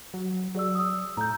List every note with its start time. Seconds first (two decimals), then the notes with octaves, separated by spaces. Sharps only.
0.14 F#3
0.55 F#3 G#4 D5 E6
0.75 D#6 E6
1.17 A2 A#5 G6